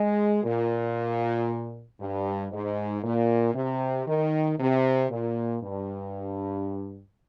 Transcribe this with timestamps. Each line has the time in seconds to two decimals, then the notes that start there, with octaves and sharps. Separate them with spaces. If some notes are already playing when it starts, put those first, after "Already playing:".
Already playing: G#3
0.44 A#2
1.99 G2
2.51 G#2
3.03 A#2
3.54 C3
4.07 D#3
4.58 C3
5.10 A#2
5.62 G2